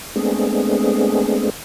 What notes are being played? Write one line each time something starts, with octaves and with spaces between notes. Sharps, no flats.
G#3 A3 B3 C4 D4 G#4